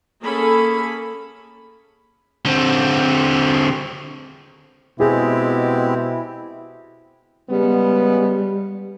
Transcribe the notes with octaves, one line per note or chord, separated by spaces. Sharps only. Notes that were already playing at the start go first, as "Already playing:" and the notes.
A#3 C#4 G#4 A4 B5
D3 C4
B2 G#3 C4 E4 G4 G#4
C#3 G3 G#3 B3